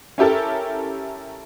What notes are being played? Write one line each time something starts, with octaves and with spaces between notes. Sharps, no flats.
C#4 E4 G4 A4 A#4